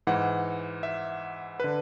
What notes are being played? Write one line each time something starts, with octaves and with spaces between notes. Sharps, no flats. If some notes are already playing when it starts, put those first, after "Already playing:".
G#2 E3 F#5
E5
D3 B4